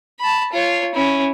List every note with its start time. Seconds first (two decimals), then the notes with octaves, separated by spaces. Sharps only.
0.20 A5 B5
0.52 F4 C#5
0.95 C#4 E4